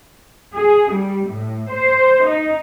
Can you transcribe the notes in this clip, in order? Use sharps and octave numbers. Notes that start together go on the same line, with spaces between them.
G#4
G3
A2
C5
D#4